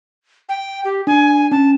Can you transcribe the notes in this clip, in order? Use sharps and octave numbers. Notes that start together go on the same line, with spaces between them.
G5
G4
D4 G#5
C#4 A5